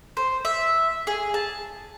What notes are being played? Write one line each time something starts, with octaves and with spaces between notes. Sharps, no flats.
C5
E5
G#4
A5